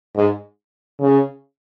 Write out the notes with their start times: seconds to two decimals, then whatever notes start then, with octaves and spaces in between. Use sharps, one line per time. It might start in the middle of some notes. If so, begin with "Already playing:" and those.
0.16 G#2
1.00 C#3